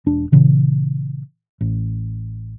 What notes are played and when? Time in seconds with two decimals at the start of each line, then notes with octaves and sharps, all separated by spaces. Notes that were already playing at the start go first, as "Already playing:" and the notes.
0.06 E1 D4
0.32 A#2 C#3 E3
1.61 A1